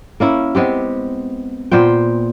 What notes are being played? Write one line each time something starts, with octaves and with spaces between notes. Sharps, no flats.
A#3 C#4 E4
G#3 B3 C4 G4
A#2 B3 C5 G5